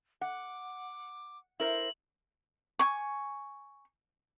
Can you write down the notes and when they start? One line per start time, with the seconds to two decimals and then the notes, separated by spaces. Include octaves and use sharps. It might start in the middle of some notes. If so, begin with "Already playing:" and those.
0.21 F#5 D6
1.60 E4 A#4 C5 F#7
2.79 G#5 C#6